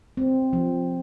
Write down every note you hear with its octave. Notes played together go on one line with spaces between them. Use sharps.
C4
F3